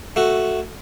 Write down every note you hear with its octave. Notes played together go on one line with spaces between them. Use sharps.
A3 F#4